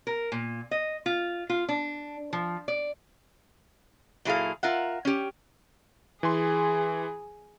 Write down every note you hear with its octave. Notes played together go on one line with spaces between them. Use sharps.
A#4
A#2
D#5
F4
F4
D4
F3
D5
A#2 F#3 E4 G#4 A4 F5
F4 A#4 E5 F#5
C#4 G4
E3 G#4 G#5 C6